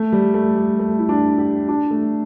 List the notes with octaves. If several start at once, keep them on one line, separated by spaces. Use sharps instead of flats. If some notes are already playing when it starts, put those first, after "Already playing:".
Already playing: A3
G3
A3
G3
A3
E4
D4
G4
D4
A3